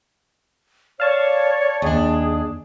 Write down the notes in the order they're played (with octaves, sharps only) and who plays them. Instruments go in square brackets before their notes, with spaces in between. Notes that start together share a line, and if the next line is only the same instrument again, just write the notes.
[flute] C#5 [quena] D5 [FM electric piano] F5 A5 C#6
[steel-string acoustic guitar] D#2 D4 [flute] G#4